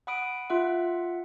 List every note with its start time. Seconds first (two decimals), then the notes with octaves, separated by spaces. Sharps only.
0.07 F#5 B5 D#6 D7
0.50 F4 E5 F#5